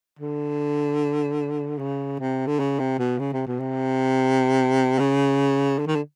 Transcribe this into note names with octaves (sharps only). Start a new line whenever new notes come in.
D3
C#3
C3
D3
C#3
C3
B2
C#3
C3
B2
C3
C#3
D3
D#3
D3